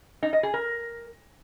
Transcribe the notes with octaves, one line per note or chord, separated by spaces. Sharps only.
D#4
D#5
G#4
A#4